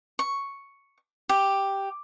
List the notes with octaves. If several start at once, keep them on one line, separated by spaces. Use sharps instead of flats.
C#6
G4